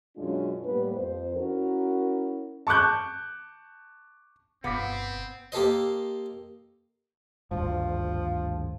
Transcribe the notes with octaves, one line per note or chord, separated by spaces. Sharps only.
F#2 B2 G#3 C#4 D4 F4
A2 G3 A#3 B3 B4
F2 C5
C#4 E4 F#4 A#4
A5 C#6 D6 F#6 G6
G1 B2 B3 C4 F5 D6 B6
A#3 G4 A4 C5 D#5
G#1 D2 G2 F3